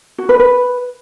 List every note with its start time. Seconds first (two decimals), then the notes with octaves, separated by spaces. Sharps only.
0.18 F#4
0.29 B4
0.39 B4